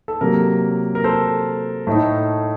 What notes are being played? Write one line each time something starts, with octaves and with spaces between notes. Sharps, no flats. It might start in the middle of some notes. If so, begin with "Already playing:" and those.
A4
C3 F#3 A#3 A#4
A#4
A4 C5
A2 A3 D#4